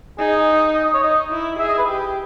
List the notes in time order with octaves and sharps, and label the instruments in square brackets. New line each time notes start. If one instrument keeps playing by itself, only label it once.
[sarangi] D#4 [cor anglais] G#4
[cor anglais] D#5
D#5
C#5
[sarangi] D#4 [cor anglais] D#5
[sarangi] E4
[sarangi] G#4 [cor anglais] E5
[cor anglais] D#5
B4
[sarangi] G4